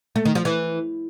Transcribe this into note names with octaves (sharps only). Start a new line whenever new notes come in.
A3
D#3
F3
E3